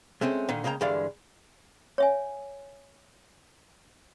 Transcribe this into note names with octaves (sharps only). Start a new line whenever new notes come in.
G#3 A3 C4 C#4
A#2 D3 D#3
C#3 G#3 A#3 G5 A#5
G2 D3 E3 G#3 D5 F5
C#5 E5 G#5